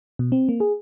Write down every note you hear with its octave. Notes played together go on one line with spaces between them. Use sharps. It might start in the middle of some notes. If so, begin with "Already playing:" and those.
B2
C4
A#3
G#4